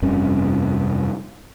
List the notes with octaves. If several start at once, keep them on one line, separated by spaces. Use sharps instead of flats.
F1 G2 C3 C#4